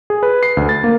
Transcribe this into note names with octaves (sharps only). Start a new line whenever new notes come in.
G#4
B4
C7
D2
A6
A#3